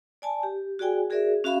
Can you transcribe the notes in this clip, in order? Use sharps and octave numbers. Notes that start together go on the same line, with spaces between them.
D5 G#5 A5
G4
F#4 G#4 D5 G5 G#5
F#4 G#4 A#4 D5 E5
C#4 F#4 E5 F5 B5